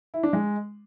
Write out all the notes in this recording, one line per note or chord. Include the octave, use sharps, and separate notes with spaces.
E4
D4
G#3